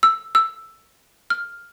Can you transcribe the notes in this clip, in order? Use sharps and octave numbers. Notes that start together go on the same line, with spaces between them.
E6
E6
F6